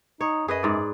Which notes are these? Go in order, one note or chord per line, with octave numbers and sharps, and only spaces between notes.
D#4 C#5
F#2 G#4 B4 D#5
G#2 D5